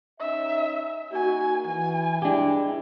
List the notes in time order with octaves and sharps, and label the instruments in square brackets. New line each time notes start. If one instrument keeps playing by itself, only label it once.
[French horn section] C#4 D#4 D#5 [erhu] E5
[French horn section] A#3 D#4 F#4 [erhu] G#5
[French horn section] E3 [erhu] G#5
[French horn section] G#3 E4 [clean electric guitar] D4 G4